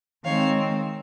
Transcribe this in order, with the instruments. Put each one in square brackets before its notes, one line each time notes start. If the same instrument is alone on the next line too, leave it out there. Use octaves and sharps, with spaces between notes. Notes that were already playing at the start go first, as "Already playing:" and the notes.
[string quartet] D#3 G#3 C4 C#5 F5